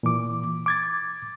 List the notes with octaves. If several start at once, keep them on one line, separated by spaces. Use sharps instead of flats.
A#2 E3 D6
D6 G#6 A6